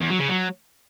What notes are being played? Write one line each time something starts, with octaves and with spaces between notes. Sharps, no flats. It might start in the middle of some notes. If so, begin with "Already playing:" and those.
E2
F#3
C#3
F#3